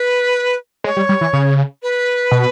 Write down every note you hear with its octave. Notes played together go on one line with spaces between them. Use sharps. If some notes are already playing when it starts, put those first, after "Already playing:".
Already playing: B4
G#3 C#5
G3
G3
E3
C#3
B4
B2